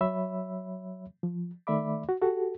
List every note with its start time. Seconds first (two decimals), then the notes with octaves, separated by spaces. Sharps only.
0.01 F#3 C#5 E5 B5 E6
1.23 F3
1.67 D#3 A3 D5 E5 B5 D6
2.09 F#4
2.22 F#4 G4 A4